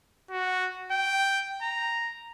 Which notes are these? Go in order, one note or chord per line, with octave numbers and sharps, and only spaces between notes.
F#4
G5
A#5